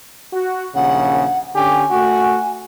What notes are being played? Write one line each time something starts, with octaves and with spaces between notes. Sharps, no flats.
F#4
A#1 D#2 C#3 F#5
D3 C#4 G4 G#5
A3 F#4